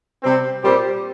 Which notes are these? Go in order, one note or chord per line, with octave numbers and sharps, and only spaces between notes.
C3 G3 C4
A#2 G3 C4 G4 C5